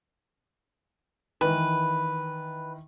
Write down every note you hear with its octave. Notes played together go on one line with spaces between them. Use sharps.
D#3 E3 B4